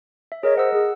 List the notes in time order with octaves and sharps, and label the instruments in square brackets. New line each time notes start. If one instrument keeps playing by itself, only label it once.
[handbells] E5
[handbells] G#4 A#4 D#5 [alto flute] C#5
[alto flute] C5 [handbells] F#5 E6
[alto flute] G#4